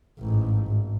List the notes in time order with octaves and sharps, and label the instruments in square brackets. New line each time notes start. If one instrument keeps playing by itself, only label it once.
[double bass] A1 G#2
G#1